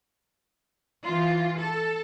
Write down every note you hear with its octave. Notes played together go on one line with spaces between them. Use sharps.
E3 F4
A4